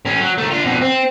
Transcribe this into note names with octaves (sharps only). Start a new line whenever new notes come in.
A2 C#4
F#3
D#3 A3
D4 F4
F2 B2
C4